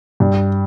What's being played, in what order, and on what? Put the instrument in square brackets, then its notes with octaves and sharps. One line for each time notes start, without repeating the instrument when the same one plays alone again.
[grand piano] G2